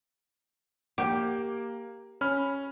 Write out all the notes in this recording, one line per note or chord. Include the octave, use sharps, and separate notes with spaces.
A#3 G4
C#4 B5 F6